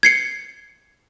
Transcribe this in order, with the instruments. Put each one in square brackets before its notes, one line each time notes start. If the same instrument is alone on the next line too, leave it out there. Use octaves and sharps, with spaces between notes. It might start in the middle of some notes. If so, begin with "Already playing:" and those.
[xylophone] G#6 C7 C#7